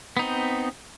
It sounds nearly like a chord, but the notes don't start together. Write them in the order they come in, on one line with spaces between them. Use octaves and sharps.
B3 D#4 C4